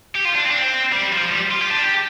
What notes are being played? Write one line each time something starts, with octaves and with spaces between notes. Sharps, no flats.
G4
F4
D4
C4
D4
C4
G3
F3
G3
F4
G4
D4
G4